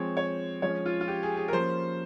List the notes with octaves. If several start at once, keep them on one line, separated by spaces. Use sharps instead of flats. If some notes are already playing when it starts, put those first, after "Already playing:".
Already playing: F3 G#3 C4 C#5
C#5
F3 G#3 C#4 C#5
F4
F4
G4
G#4
G#4
A#4
F3 A#3 C#4 C5